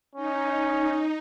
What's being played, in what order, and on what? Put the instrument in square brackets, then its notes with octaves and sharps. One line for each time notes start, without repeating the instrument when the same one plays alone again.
[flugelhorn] C#4 [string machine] D#4